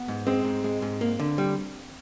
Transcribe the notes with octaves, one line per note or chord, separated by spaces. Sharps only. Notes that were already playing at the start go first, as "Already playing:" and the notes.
Already playing: B3
G#2
G#3 C4
G#2
G#3
G#2
A#3
D3
G3